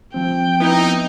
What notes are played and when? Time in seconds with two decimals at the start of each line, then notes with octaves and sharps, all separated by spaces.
0.14 F3 C4 G5
0.60 B3 D#4 E4